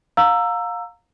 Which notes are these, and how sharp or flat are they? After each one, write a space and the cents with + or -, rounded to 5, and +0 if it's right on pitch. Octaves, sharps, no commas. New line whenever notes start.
F5 +25 A#5 -15 E6 +15